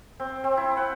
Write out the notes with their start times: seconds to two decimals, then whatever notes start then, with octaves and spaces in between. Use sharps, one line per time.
0.20 C4
0.44 C4
0.57 E4
0.77 F#5